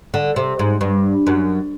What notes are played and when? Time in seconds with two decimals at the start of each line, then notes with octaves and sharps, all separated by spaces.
0.14 D3
0.36 C3
0.59 G#2
0.81 G2
1.27 F#2